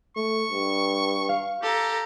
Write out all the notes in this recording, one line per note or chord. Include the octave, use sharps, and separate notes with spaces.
A3 C#6
G2
F5
G4 A4 A#5